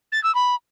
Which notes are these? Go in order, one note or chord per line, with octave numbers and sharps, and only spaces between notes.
A6
E6
B5